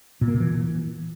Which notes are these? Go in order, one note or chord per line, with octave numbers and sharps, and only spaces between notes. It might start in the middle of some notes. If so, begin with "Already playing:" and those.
A#2
A#3
A#2
E3